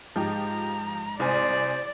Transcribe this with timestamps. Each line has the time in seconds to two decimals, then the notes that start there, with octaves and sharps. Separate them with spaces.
0.16 G#2 F3 G4 A#5
1.20 C2 C5 D5 G#5